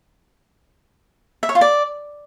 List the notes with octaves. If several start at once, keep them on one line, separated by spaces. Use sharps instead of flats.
E5
C#5
F4
D5